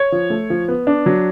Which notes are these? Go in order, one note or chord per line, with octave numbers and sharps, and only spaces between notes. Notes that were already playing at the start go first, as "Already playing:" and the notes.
Already playing: C#5
F3
A3
F3
B3
D4
F#3